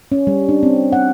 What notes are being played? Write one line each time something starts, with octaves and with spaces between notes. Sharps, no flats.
C#4
G3
D4
C4
F#5